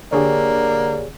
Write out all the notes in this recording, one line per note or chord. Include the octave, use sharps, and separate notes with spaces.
D3 A#3 G4 G#4 C#5 D5